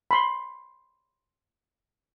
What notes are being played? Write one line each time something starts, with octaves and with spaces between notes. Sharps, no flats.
B5 C6